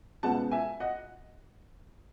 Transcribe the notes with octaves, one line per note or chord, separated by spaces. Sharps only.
C#2 B2 G#3 B3 F#5 A5
E5 G#5
D#5 F#5